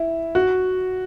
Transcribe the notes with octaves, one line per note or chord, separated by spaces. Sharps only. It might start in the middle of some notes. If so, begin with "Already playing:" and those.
Already playing: E4
F#4